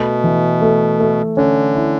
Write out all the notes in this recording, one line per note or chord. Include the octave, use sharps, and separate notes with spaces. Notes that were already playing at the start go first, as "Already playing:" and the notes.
Already playing: B2 A3
E3
A3
A3
D3 C#4
E4